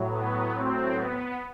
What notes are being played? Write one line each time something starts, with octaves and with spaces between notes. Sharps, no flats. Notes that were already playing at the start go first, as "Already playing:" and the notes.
Already playing: A2 F#3
B3
C4
B3